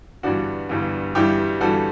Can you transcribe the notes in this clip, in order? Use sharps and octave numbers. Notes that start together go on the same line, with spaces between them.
G1 G2 E3 G3 D4 F#4
G1 G2 E3 G3
G1 G2 E3 G3 E4 G4
G1 G2 E3 G3 F#4 A4